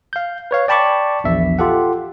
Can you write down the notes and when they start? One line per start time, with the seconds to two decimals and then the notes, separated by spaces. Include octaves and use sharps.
0.13 F5 G6
0.51 B4 C#5 F5
0.68 D5 G5 A5 B5 C#6 D6
1.24 A#1 E2 E5
1.59 F4 G4 A4 F#5